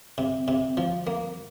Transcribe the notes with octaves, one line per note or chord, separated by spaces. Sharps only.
C3
C3
F3
A#3